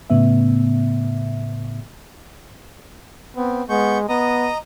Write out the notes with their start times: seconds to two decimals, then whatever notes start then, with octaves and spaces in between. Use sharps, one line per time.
0.10 A2 C#3 B3 E5
3.36 B3 C4
3.69 G#3 B3 C#6 G6
4.09 B3 D#5 A#5 D#6